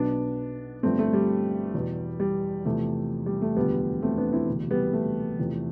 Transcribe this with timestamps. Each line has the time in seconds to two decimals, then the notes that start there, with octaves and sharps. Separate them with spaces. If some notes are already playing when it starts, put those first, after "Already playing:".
Already playing: B1 B2 B3 D4
0.83 G1 G2 F3 A3 C4
0.99 A3
1.13 G3
1.74 E2 B2
2.20 G3
2.65 E2 C3 F3 A3
3.26 G3
3.42 A3
3.57 E1 D2 D3 F3 G3 B3
4.02 A3 C4
4.18 B3 D4
4.32 C4 E4
4.48 E1 D2 C3
4.71 G3 B3
4.93 A3
5.39 E2 C3 F3